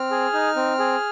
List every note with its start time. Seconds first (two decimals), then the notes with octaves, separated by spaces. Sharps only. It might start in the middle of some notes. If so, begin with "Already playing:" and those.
Already playing: C4 F6
0.11 G#4
0.34 D#4
0.56 C4
0.79 G#4